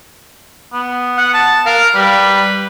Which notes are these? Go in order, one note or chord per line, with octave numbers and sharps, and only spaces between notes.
B3
F#5
A5
A#4 F5
G3 B4